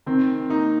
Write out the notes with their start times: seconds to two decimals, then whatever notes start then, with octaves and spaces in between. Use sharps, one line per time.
0.06 D#3 C4
0.50 A#3 D#4